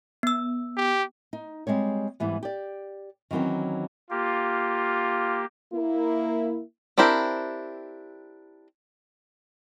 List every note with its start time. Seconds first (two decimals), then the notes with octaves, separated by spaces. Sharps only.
0.23 B3 E6
0.77 G4
1.33 D#4
1.67 G3 G#3 C4 C#5
2.20 G#2 E3 G3 B3
2.43 G4 D5
3.31 D#3 E3 F#3 C4 C#4
4.10 A#3 F4 G4
5.72 A#3 E4
6.98 C4 D4 E4 G4 A#4